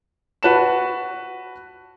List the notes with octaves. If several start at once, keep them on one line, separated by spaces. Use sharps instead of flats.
F#4 B4 A5 E7